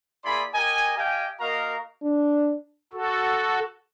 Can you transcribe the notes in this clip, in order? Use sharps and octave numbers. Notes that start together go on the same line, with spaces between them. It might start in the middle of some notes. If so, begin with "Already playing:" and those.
A#3 E4 G#4 D5 B5 C6
G4 A#4 D#5 G#5
G4 D#5 F5 G5 G#5
A#3 F#4 A#4 D#5 F5 A#5
D4
F#4 A4